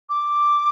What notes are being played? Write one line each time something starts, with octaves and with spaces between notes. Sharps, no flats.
D6